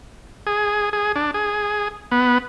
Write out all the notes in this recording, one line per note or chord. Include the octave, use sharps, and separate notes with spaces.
G#4
G#4
D4
G#4
B3